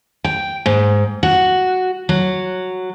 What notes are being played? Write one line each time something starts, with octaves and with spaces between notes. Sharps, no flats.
G5
G#2
F#4
F#3